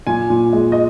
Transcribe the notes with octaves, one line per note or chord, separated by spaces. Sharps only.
A#2 G#5
A#2
G#3
D#5